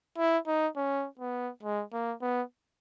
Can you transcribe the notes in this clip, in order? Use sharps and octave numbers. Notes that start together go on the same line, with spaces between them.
E4
D#4
C#4
B3
G#3
A#3
B3